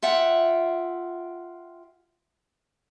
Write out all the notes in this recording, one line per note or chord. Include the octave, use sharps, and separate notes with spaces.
F4 E5 F#5 G5